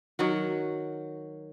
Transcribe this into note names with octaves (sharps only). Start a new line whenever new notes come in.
D#3 F#3 F#4